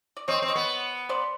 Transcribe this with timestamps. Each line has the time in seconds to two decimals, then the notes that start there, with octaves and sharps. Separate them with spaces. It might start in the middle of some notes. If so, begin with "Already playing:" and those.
0.17 D5
0.28 C4 C#5 D#5
0.42 C4
0.48 C#5 D#5
0.56 B3
1.09 C5 D5